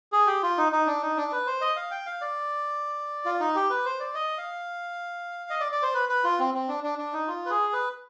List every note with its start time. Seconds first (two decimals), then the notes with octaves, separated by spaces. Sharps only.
0.13 G#4
0.27 G4
0.43 F4
0.58 D#4
0.72 D#4
0.86 D4
1.02 D#4
1.17 D4
1.32 B4
1.47 C5
1.61 D#5
1.76 F5
1.91 G5
2.06 F5
2.21 D5
3.25 F4
3.40 D#4
3.56 G4
3.70 B4
3.85 C5
4.00 D5
4.15 D#5
4.38 F5
5.50 D#5
5.60 D5
5.72 D5
5.83 C5
5.94 B4
6.09 B4
6.24 F4
6.39 C4
6.54 C4
6.68 D4
6.84 D4
6.99 D4
7.13 D#4
7.28 F4
7.46 B4
7.50 G#4
7.73 B4